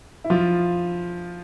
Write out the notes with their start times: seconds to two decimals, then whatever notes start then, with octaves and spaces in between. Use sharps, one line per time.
0.24 E4
0.30 F3 F4